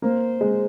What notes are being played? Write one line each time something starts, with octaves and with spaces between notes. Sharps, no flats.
A#3 C5
G#3